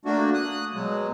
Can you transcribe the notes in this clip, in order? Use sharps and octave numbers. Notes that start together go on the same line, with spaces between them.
A3 A#3 D4 F#4
D#6 F#6
B2 F#3 G#3